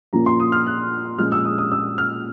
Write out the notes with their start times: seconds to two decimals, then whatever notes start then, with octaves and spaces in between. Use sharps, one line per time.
0.13 A#2 F3 A#3 C#4 A#5
0.26 C6
0.40 D#6
0.52 F6
0.66 F#6
1.18 A#2 F3 G#3 C#4 F6
1.32 E6
1.45 D#6
1.58 D#6
1.72 E6
1.98 F6